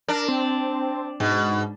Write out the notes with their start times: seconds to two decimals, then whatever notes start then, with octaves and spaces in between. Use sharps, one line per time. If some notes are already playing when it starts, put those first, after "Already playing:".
0.08 D4 A#4
0.28 C4
1.20 G#2 B2